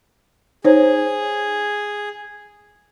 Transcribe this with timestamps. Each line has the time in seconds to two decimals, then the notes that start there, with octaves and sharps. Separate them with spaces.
0.65 D#4 G#4 C5 C#5